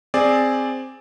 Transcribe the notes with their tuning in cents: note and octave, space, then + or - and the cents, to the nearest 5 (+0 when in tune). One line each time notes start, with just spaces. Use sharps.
C4 +0 G#4 +0 D5 +0